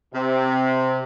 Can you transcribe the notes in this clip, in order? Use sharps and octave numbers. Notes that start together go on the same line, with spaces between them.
C3